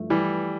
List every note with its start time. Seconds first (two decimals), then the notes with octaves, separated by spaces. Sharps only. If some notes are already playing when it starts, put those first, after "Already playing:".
Already playing: G2 F3 A3 E4
0.10 E3 G3